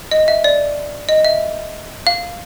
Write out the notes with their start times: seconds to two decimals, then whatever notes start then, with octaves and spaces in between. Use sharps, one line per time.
0.11 D#5
0.28 E5
0.44 D5
1.09 D#5
1.25 E5
2.07 F5